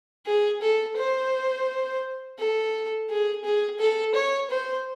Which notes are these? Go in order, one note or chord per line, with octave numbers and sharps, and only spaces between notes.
G#4
A4
C5
A4
G#4
G#4
A4
C#5
C5